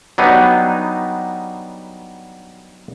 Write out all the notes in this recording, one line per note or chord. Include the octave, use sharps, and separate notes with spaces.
F#3 G3 B3 D4 D#4